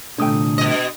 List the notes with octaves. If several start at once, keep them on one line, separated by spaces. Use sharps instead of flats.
C2 A#2 D3 A3 D4 G5 D#6
B2 D#5